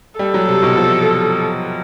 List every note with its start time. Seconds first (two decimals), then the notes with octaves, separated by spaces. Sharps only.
0.19 G3 A4
0.34 F#3
0.48 C3
0.63 B2
0.77 F3